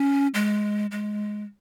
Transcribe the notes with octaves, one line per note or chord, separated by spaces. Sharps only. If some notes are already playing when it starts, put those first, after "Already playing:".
Already playing: C#4
G#3
G#3